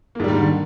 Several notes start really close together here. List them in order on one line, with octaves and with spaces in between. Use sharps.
A#3 G#2 G3 D#3 D3